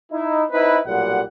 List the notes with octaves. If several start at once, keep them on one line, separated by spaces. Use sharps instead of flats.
D#4 E4
C4 D#4 E4 B4
B1 A#2 G3 F#5